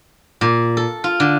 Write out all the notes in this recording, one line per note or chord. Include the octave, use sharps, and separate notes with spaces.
A#2
A4
F4
D3